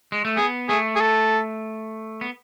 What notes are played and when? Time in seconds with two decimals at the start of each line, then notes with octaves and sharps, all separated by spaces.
0.12 G#3
0.25 A3
0.37 B3 G#4
0.69 A3 G#4
0.96 G#4
1.01 A4
2.21 B3